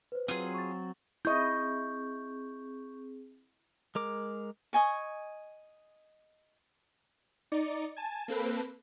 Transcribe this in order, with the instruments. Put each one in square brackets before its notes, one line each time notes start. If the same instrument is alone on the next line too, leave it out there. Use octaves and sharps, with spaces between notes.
[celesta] B4 C5
[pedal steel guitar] F#3 C4 [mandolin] F4 G#4
[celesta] C#6 A6
[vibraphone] C4 G#4 [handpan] E4 D#5 [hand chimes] C#6 G6
[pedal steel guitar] G#3 A#4 D6
[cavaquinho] D#5 G#5 C#6
[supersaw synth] D#4 D5 C#7
G#5 A5
A#3 C4 A4 B4